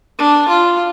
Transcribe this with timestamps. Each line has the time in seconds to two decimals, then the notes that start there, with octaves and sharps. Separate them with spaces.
0.19 D4
0.48 F4